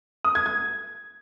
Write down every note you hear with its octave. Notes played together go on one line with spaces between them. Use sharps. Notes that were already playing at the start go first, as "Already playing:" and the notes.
D#6
G#6
G#6